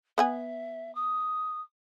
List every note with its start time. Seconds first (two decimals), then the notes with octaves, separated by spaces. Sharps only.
0.18 B3 E5 F#5 G#5
0.95 D#6